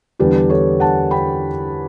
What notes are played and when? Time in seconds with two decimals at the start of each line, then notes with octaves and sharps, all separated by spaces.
0.19 E2 D3 G3 B3 D4 G4 B4
0.50 A4 C#5
0.80 F#5 A5
1.11 G5 B5